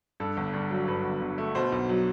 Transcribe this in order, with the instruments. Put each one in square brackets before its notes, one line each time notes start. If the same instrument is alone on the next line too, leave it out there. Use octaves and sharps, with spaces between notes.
[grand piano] G2 A4
G1
G2
F#3
G2 B4
G1
G1
A3
B2 C5
B1
F#3